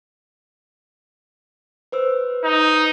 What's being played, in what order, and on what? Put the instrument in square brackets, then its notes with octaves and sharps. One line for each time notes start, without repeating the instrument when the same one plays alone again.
[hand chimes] B4 C5 E6
[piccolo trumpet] D#4